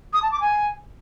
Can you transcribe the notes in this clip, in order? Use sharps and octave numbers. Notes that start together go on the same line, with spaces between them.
D#6
A5
D6
G#5